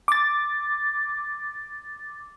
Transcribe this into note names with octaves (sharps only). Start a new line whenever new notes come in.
D6 A6